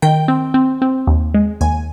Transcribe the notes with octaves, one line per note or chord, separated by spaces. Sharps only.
D#3 G5
C4
C4
C4
D#2
G#3
D#2 G#5